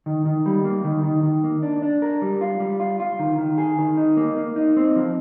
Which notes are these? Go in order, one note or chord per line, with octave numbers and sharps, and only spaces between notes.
D#3
D#3
G3
A#3
D#3
D#3
D#3
A#3
D4
D4
A#4
G3
F4
G3
F4
F4
D#3
D#3
G#4
D#3
D#4
A#3
A#3
D#4
C4
F3